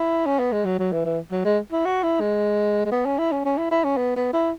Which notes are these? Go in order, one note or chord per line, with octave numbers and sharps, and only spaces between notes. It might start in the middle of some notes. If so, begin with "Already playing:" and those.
Already playing: E4
C#4
B3
G#3
F#3
F#3
E3
E3
F#3
G#3
E4
F#4
E4
G#3
G#3
B3
C#4
E4
C#4
C#4
E4
E4
C#4
B3
B3
E4